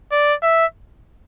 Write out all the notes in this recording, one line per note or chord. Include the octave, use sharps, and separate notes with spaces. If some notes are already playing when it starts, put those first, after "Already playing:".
D5
E5